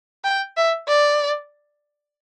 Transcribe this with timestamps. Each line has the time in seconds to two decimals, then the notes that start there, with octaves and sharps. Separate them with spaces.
0.24 G5
0.57 E5
0.88 D5